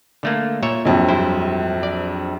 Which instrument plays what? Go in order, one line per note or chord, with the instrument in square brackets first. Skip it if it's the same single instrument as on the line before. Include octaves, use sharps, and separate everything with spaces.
[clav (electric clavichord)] D3 A3 A#3
A#2 C#5 E5
[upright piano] A#1 F2 F#3
[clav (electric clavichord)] G2 E4 C5
D5